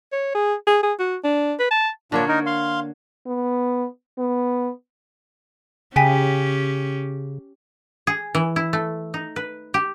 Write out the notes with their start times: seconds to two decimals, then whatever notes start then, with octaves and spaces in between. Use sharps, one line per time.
0.12 C#5
0.35 G#4
0.67 G#4
0.83 G#4
0.99 F#4
1.24 D4
1.60 B4
1.71 A5
2.12 A#2 D3 A#3 D4 C#5
2.28 D#4 A#4
2.46 F5 C6
3.27 B3
4.18 B3
5.96 C#3 C#4 G4 G5 G#5 B6
8.07 G#4
8.35 E3
8.56 E4
8.73 A3
9.14 D#4
9.36 B4
9.74 G4